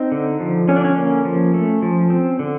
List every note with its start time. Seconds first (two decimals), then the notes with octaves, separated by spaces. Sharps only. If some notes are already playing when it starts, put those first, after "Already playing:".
Already playing: C4 D#4
0.12 D3
0.40 F3
0.68 D3 C#4
0.76 D4
0.84 C#4
0.96 A#3
1.25 F3
1.54 A3
1.82 F3
2.10 C4
2.39 D3